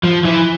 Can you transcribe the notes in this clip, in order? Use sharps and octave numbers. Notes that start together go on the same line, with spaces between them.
F3
E3